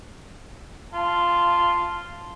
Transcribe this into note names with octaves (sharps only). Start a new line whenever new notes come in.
F4 A5